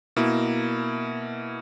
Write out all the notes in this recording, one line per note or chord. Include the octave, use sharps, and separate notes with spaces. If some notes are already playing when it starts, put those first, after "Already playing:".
B2 A#3 E4